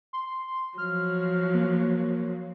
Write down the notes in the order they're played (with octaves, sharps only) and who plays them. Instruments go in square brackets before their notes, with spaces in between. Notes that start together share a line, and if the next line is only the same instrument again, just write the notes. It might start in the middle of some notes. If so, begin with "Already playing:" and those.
[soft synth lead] C6
[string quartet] F3 F#3 [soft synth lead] F6
[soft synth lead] A#3